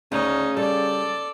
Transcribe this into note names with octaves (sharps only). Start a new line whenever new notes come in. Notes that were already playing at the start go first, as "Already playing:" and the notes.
D2 C#3 C#4 D#4
G3 A4 D5